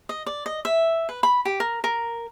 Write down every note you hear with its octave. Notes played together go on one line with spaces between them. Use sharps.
D#5
D5
D#5
E5
B4
B5
G4
A#4
A#4